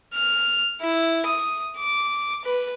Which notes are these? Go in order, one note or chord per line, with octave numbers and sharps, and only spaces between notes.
F6
E4
D#6
D6
B4